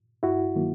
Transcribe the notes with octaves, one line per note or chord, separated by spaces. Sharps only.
G2 E4 F#4
D#3 F#3 A#3